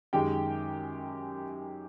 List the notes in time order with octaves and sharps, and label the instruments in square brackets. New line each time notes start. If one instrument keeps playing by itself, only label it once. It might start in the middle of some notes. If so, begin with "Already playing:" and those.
[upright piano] F#2 D#3 G#3 G4 G5